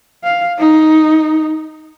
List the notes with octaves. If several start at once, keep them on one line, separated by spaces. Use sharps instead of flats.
F5
D#4